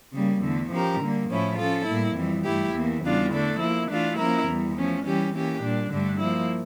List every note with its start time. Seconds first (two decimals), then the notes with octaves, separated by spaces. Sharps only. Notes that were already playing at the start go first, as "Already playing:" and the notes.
0.13 C#3 G3 A#3
0.42 E2 D3 A3
0.70 F3 C#4 G4 A#4
1.00 D3 G3 A#3
1.29 A2 F3 A3 C#4 E4
1.58 F3 C#4 F4 A4
1.86 A2 G3 A#3 E4
2.15 F2 E3 G3
2.44 G2 E3 A3 E4 G4
2.73 E2 E3 A#3
3.02 E2 C#3 G3 D4 F4
3.31 D3 A3 D4 A4
3.60 F3 A#3 E4
3.89 E3 A3 D4 F4
4.18 F3 A#3 C#4 E4 A#4
4.47 E2 E3 G3
4.76 F3 A3 C#4
5.05 E3 G3 C#4 G4
5.34 E3 A#3 C#4 G4
5.63 A#2 G3 D4
5.91 G2 D3 A3 D4
6.20 F3 A#3 E4